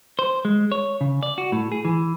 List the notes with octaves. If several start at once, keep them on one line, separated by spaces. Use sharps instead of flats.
C5
G#3
C#5
C#3
D5
F#4
A2
G#4
E3